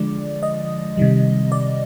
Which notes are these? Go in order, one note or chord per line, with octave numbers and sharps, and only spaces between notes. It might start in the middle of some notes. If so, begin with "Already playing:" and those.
Already playing: D3 F3 G#3 D5
D#5
C3 D#3 G3
D5